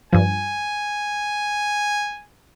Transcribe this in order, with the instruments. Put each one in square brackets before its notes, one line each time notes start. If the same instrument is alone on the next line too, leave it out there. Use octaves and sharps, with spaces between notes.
[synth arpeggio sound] G2 F3 [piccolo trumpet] G#5